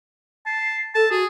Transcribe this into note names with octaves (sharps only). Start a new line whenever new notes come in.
A5 C7
A4 A5
F#4 G#4